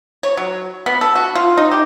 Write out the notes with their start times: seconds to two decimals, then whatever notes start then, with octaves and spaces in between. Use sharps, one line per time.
0.23 C#5
0.37 F#3
0.86 B3
1.01 A4
1.15 F#4
1.35 F4
1.57 D#4
1.71 G4